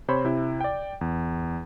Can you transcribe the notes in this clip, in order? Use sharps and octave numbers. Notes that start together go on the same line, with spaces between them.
C3 C5 C#5 B5
C3 E4
D5 G5
E2